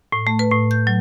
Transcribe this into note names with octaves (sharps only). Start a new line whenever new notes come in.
A2
A3
B4
A2
G6
F#3